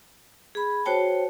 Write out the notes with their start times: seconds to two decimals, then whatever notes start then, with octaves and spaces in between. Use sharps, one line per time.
0.55 G#4 B5
0.85 F#4 C5 C#5 G5 A5